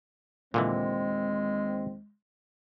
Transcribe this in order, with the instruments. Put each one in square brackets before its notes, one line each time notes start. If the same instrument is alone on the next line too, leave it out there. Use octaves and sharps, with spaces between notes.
[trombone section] D#2 C4 [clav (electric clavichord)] A#2 D3 E3 [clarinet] G#3